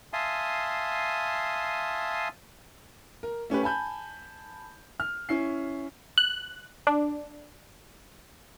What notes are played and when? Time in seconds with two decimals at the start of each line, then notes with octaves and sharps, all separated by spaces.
0.13 E5 F5 G#5 A5 C6 D#6
3.23 A#4
3.50 A3 C#4 G4 B4
3.63 G#5 A5 B5 G6
5.00 F6
5.29 C#4 E4 C7
6.18 F#6
6.87 D4